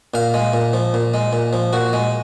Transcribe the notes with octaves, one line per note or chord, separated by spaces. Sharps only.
A#2 F5
G#3
A#2
F3
A#2
G#3
A#2
F3
A#2 F#4
G#3